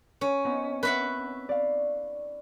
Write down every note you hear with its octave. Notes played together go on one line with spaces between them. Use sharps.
C#4
B3 C4 D#4
B4 E5 F#5
D5 F5